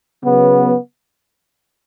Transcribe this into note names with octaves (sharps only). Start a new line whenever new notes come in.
C#3 F#3 B3